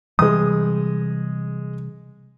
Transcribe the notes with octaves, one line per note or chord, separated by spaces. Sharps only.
C3 E3 G3 G#3 D#6